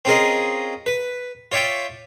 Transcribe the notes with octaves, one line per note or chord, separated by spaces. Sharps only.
C4 C#4 F4 G#4 A#4 D#5
B4
F4 C#5 D5 E5 G5